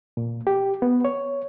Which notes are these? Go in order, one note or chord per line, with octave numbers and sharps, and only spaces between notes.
A#2
G4
B3
C#5